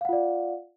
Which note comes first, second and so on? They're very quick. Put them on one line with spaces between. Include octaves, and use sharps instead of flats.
F5 F#5 F4 D5